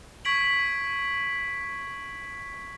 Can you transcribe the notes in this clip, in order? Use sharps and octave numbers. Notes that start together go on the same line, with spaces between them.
C#6 G#6 B6 D7 F#7